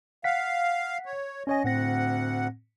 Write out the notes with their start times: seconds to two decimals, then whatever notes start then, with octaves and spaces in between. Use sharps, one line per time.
0.24 F5 F#5 B6
1.06 C#5
1.47 C#4 C#5 D#5 G#5
1.64 D2 A2 C4 F#5 A#6